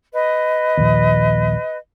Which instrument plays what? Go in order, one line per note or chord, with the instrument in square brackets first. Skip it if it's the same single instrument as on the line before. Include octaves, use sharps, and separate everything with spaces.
[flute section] B4 D#5
[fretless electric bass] A#1 D#2